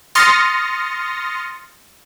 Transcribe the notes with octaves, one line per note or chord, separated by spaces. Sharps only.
C6 D#6 F6 A6 A#6 C#7